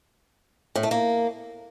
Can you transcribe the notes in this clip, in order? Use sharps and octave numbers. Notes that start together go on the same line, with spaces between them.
A2
A3
A#3